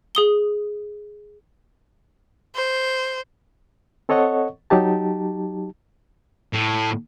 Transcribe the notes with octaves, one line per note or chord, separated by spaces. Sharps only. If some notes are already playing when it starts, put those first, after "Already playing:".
G#4 D#6 G7
C5
C4 A4 C#5 D#5 F#5 C#6
F#3 D#4 G4 A5
A2